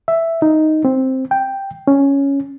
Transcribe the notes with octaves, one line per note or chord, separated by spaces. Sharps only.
E5
D#4
C4
G5
C#4